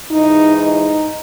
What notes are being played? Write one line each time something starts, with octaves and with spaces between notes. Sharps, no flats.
G#2 E3 D#4
D#4